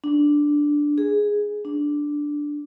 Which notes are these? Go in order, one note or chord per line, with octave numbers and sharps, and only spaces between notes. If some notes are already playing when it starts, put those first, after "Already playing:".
D4
G#4
D4